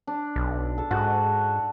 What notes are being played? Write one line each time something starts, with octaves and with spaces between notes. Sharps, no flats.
D4
B1
A4
G#2 F#4